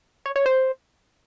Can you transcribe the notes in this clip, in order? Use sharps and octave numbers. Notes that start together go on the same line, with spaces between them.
C#5
C#5
C5